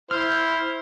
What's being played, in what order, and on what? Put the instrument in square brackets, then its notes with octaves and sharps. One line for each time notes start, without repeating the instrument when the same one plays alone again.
[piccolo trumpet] E4 [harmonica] C5 [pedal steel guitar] F6